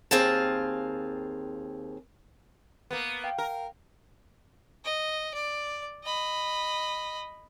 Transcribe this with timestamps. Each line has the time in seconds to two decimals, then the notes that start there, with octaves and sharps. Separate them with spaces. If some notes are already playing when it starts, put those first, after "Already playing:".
0.11 D#2 C4 G#4 F5 A5
2.91 A#3 B3
3.24 F5 G5
3.38 A#4
4.84 D#5
5.35 D5
6.04 D#5 B5